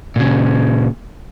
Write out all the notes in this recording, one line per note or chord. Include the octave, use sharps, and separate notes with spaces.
A#2 C#3